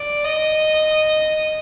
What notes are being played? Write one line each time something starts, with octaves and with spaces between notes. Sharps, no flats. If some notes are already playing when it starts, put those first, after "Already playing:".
Already playing: D5
D#5